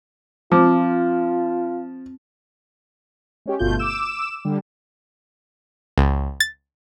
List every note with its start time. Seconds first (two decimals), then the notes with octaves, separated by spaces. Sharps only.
0.52 F3 C4 F4 D6
3.46 G#3 C#4 G4
3.59 G1 B2 A3 F4 G6
3.79 D6 E6 E7
4.45 D3 G3
5.98 C#2
6.40 A6